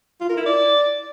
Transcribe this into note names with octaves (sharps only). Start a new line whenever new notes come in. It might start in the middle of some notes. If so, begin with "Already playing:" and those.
F4
A#4
E4
D5